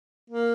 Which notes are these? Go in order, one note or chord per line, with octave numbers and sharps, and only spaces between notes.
A#3